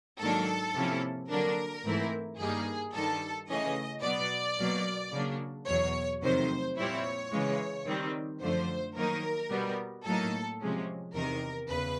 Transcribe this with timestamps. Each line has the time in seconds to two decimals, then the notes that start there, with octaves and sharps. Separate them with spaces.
0.20 G#2 D#3 F#3 A#3 D4 A4
0.74 C3 F3 A#3 C#4 E4
1.29 D3 F#3 A#3 D4 A#4
1.84 G#2 E3 A3 C4 E4
2.38 G2 D#3 G3 A#3 D#4 G#4
2.94 G2 D#3 G3 A4
3.48 C#3 E3 A3 C#4 D#5
4.03 B2 F#3 B3 D5
4.58 B2 F#3 A#3
5.12 C#3 F#3 A#3 D4
5.67 E2 B2 F#3 C#5
6.22 F2 C3 D#3 F#3 A3 C5
6.76 A#2 G3 C4 E4 C#5
7.32 C#3 E3 G#3
7.86 D#3 G3 C4
8.41 F#2 D3 F3 A3 C5
8.96 D#3 F#3 A#3 D#4 A#4
9.50 B2 G3 B3
10.05 A2 F#3 A#3 D#4 A4
10.60 C3 F3 G#3 C#4
11.14 E2 C3 D#3 A#4
11.69 E2 C#3 B4